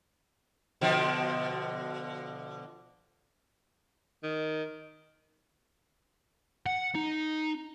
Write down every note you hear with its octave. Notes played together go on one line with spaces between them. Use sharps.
B2 D3 F3
D#3
F#5
D#4